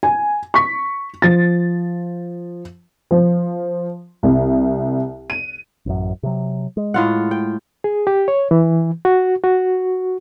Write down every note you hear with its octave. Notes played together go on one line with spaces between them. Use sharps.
G#5
C#6 B6
F3 A6
F3
C2
D#7
A1 F#2
C3 F#3
G#3
A2 F4 F#5
G5
G#4
G4
C#5
E3
F#4
F#4